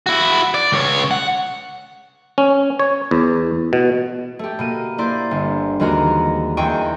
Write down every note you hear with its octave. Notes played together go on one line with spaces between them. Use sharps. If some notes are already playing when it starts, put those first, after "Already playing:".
E4 F#4
D5
C#2 C#5
F#5
C#4
C#5
E2
B2
A3 G4
B2 A#3 D#7
A#3 E4 C5 D5
G1
D#2 E3 G#3 F#4 A#4 A#5
E2 A#3 C4 D#5 G5 C#6